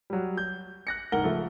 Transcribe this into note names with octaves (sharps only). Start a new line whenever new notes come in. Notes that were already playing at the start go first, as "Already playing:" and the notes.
F#3 G3
G6
F#6 A#6 C#7
F#1 G#2 A#4 F#5 G7
C#3 F3 A3 A4